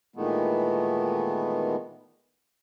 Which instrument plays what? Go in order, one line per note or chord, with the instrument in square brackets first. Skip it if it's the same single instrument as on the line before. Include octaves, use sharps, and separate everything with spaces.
[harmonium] A#2 D#3 E3 G#3 A3 B3